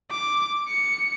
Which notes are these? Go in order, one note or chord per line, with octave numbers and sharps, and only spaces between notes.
D6
C#7